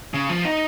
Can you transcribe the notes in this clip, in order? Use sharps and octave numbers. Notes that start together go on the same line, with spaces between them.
C#3
F3
D#4